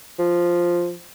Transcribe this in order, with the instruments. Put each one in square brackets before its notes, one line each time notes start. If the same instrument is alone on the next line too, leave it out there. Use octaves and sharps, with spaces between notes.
[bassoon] F3